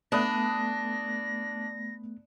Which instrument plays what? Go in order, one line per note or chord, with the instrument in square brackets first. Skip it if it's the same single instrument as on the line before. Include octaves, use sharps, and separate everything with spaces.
[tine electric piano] A3 B3 [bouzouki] D4 [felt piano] B5 D#6 F#6 [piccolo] A#6